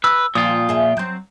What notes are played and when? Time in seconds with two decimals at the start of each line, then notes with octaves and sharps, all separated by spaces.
0.04 B4 E6
0.35 A#2 F3 F4 G5 D#6
0.69 G#4 E5
0.97 F#3 C4